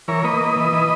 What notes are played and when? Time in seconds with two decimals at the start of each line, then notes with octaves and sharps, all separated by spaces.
0.08 E3 A#4 C#5
0.24 A#3 B4 D#5
0.40 A#3
0.56 E3
0.73 E3